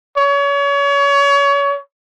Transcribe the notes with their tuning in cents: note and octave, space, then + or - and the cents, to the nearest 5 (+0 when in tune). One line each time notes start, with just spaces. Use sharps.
C#5 +30